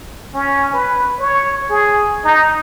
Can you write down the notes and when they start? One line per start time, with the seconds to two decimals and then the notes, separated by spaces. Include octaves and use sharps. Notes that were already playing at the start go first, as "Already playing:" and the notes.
0.35 C#4
0.74 B4
1.20 C#5
1.70 G#4
2.24 D#4